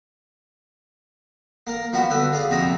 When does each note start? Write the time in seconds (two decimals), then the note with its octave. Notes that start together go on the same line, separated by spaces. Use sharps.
1.67 A#3 A#4
1.93 F3 G3 B3 F#4
2.10 D3 A3 B4
2.32 G#4 D5 F5
2.49 A#1 F2 C3 F#4 A#5 B5